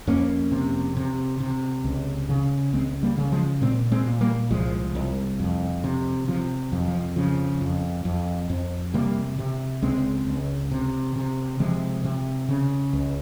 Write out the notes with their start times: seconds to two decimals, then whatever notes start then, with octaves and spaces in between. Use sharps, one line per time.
0.07 F2 A#3 C#4
0.52 C3
0.97 C3
1.40 C3
1.84 C#2
2.29 C#3
2.73 C#2 G#3 C4
3.03 G3 A#3
3.18 C#3
3.32 F3 G#3
3.62 A#2 G#3 C4
3.92 G#3 C4
4.06 A#2
4.21 G3 A#3
4.51 C2 F3 G#3
4.95 C2
5.39 F2
5.84 C3
6.28 C3 F3
6.72 F2
6.87 F3
7.16 C#3 F3
7.61 F2
8.05 F2
8.50 F2
8.94 C3 G3 A#3
9.39 C3
9.82 C#2 G#3 C4
10.27 C#2
10.71 C3
11.16 C3
11.60 C3 F3 G#3
12.04 C3
12.48 C#3
12.93 C#2